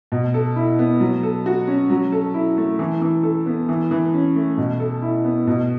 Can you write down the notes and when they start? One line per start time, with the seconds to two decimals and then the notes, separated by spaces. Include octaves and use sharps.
0.12 B2
0.34 A4
0.56 E4
0.79 B3
1.00 F#3
1.23 A4
1.46 F#4
1.67 C#4
1.90 F#3
2.12 A4
2.34 E4
2.58 A3
2.79 E3
3.02 E3
3.23 A4
3.46 B3
3.69 E3
3.91 E3
4.14 C#4
4.36 A3
4.58 B2
4.80 A4
5.02 E4
5.25 B3
5.47 B2